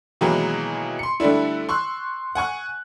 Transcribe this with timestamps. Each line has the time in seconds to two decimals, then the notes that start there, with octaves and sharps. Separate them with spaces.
0.21 B2 D#3 E3 F#3 G#3 A#3
0.99 C6 C#7
1.20 D3 G3 A3 D4 E4
1.69 C6 C#6 E6 F#6
2.35 F#5 G#5 C#6 F#6